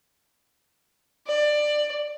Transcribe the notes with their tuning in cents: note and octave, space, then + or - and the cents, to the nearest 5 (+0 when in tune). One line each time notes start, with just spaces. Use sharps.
D5 +15